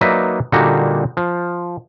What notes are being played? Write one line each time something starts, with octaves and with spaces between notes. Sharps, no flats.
F#3 A#3 D#4 B4 D5 E5
A#2 D3 G3 A#3 D#4 F#4
F3